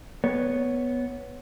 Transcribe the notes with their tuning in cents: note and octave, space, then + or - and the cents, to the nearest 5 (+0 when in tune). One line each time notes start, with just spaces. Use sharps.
B3 +0 C#5 +0